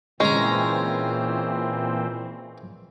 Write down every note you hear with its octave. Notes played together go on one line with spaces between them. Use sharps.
A#2 E3 G#3 C4 C#4 A#5